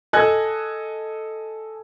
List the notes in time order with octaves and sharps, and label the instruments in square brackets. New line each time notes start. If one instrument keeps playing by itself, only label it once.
[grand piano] A4 D#5 G#5 A5 F#6 G#6